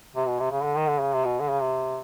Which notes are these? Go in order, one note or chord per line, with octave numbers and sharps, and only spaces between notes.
C3
B2
C3
C#3
D3
D#3
D3
C#3
C3
B2
D3
C#3
C3